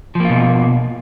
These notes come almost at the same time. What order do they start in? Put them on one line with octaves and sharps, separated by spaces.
F3 A#3 F4 B2